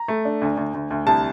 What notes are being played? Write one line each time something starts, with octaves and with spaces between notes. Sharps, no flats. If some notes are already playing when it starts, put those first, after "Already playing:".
Already playing: A#5
A3
D4
D2
D2
D2
D2
C2 A5